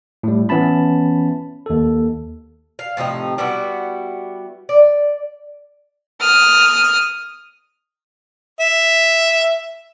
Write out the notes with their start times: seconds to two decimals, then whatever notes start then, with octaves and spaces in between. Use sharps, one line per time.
0.23 A2 G3
0.49 E3 B3 C#4 E4 A5 B5
1.66 D#2 A4
2.79 F5
2.97 A2 C3 F3 D#4
3.38 G3 B3 E4 F#4
4.69 D5
6.20 D#6 F6
8.60 E5